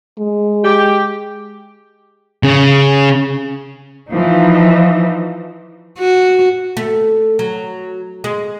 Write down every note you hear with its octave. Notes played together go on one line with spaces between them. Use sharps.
G#3
G4
C#3
E3 F3 D#4
F#4
A3
F#3
G#3